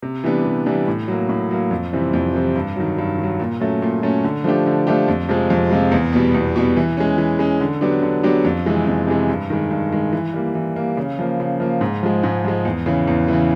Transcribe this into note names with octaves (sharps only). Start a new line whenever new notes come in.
C3
E3 G3 B3 D4
C3
E3 G3 B3 D4
A2
F#3 A#3
A2
F#3 A#3
F2
C3 E3 G3 C4
F2
C3 E3 G3 C4
G2
D#3 F#3
G2
D#3 F#3
A#2
F#3 A3 C#4
A#2
F#3 A3 C#4
D3
F3 A3 D4 G4
D3
F3 A3 D4 G4
F2
C3 F3 G#3
F2
C3 F3 G#3
E2
B2 G3 B3
E2
B2 G3 B3
E3
G#3 C#4
E3
G#3 C#4
D3
F#3 B3 D4 G4
D3
F#3 B3 D4 G4
F2
C3 E3 G#3
F2
C3 E3 G#3
G2
D#3 G#3
G2
D#3 G#3
E3
G3 A#3
E3
G3 A#3
C#3
F3 A#3
C#3
F3 A#3
G#2
F3 G#3
G#2
F3 G#3
E2
C#3 E3
E2
C#3 E3